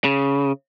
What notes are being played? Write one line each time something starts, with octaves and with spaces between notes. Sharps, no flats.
C#3